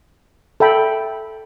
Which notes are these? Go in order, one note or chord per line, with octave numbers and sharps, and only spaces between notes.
A4 E5 G5 B5